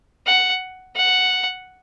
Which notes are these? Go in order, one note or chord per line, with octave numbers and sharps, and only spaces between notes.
F#5
F#5